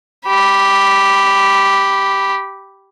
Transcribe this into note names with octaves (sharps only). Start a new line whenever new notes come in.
G4 B5